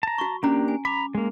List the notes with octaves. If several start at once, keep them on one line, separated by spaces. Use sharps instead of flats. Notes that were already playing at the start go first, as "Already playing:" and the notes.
A5 A#5
F#4 C#6
A#3 C#4 D4 G4 A#5
G#5
A#5 B5 D6
G#3 A#3